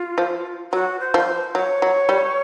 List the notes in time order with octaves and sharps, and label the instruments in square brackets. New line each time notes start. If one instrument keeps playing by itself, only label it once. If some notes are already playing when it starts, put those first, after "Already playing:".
Already playing: [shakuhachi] F4
[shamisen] F3
[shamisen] F#3 [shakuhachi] F#4
[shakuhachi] C5
[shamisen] F3
[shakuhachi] C5
[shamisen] F#3 [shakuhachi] C#5
[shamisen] F#3
G3